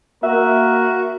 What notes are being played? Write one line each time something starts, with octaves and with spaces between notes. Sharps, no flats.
A#3 F#4 A#4 E5